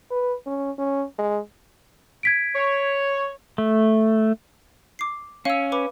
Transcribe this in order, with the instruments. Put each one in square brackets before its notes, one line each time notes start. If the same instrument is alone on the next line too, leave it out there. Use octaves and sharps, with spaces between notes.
[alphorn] B4
C#4
C#4
G#3
[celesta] G#6 B6 D7
[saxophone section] C#5
[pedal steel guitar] A3
[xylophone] D6 C7
[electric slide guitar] C#4 [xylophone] F5 E6
[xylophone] B4 B5 D6